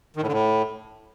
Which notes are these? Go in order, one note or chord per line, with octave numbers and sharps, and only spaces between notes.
D#3
A2
D3
A2